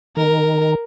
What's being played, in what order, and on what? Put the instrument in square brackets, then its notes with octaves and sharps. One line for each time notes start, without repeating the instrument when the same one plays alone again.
[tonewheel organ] D#3 [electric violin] A#4